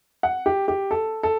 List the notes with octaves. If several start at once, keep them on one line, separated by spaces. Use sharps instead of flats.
F#5
G4
G4
A4
A4